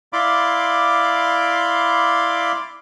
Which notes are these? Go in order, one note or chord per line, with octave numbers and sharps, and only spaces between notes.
E4 D5 F5 B5 C6 D6